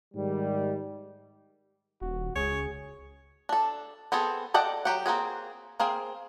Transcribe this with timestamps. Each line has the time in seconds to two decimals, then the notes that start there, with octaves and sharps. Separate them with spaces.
0.14 G#2 D#3 G3
2.01 D#1 F#4
2.35 C#2 G#4 C#5
3.49 D4 A4
4.12 B3 C4 G#4 A4
4.54 A4 D5 D#5 F#5 G5
4.85 F#3 G4 F#5
5.06 A#3 C4 F#4 G#4
5.80 A#3 C4 G#4 F5